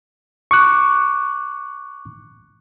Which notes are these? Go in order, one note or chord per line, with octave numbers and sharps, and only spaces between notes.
C#6 D6 F#6